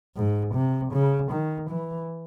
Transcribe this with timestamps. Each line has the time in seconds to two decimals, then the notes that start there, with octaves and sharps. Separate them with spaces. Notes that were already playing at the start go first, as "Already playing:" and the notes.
0.16 G#2
0.55 C3
0.93 C#3
1.31 D#3
1.70 E3